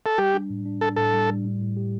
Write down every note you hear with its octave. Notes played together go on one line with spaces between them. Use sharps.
A4
G3 G4
D4
A2
D4
D4 A4
A2 A4
G3
G3
A2
A2
G4